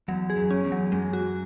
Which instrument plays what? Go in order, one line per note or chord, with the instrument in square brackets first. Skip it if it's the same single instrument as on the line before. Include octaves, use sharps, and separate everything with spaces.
[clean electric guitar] E2 [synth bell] F#3
[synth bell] G#4
[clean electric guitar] F#2
[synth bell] C#4
[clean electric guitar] E2
[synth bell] F#3
[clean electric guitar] F#2 [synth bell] G#3
[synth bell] F#4